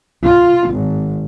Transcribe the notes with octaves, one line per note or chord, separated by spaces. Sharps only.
F4
G#1